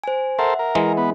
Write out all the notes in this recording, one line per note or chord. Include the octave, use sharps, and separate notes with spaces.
C5 G#5
A4 A#4 C5 E5 F#5
A#4
E3 G#3
B3